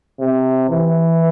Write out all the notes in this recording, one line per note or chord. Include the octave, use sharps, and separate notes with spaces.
C3
E3